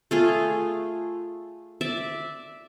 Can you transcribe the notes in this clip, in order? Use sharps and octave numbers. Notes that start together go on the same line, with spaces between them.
A3 F4 G#4
D5 E5